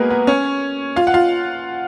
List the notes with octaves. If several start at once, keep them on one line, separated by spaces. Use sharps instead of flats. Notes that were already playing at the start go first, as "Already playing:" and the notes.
Already playing: G#3 A#3 B3 F#4 G#4 A#4 B4
B3 B4
C#4 C#5
F4 F5
F#5
F4 F5